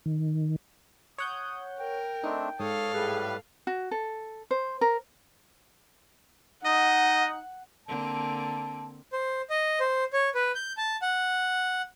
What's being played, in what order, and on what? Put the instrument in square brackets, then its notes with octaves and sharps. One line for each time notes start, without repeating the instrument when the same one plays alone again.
[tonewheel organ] D#3
[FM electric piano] C#5 F#5 G6 [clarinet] D#6
[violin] A#4 [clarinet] G5
[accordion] A3 C4 D4 [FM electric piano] D#4
[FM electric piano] G#2 [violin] A4 F5 [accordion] C#5 D#6
[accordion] A2 G3 B4 [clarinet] G#4
[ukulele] F#4
A4
C5
A#4
[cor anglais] D#4 [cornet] D#5 [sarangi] F#5
[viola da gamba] D3 A#3 C4 [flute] A5
[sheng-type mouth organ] C5
D#5
C5
C#5
B4
G6
A5
F#5